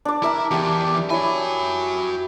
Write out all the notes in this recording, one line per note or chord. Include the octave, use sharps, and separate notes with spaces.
D4 D5
E4 A#4 E5 A#5
E2 E3 G4 A5
E4 F#4 C#5 G#5